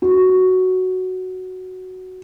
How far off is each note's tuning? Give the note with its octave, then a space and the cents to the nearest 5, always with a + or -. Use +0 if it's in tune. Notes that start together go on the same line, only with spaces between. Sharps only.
F#4 +5